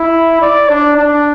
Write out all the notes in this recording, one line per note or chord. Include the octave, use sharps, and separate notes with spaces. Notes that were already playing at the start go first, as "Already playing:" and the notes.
Already playing: E4
D5
D4
D4